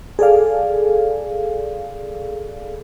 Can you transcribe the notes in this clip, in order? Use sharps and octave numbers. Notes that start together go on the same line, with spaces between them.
G#4 A4 D5 F5